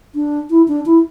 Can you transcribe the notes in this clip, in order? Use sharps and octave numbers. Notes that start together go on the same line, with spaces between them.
D4
E4
D4
E4